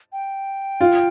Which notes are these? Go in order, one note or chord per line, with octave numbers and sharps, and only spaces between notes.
G5
F4